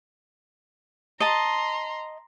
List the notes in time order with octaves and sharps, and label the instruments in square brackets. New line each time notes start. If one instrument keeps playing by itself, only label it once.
[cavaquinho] D#5 A5 [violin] A#5 C6